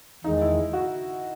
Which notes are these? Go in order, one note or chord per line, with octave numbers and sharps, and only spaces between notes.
E2 D#3 G#3 D#4
E4
F#4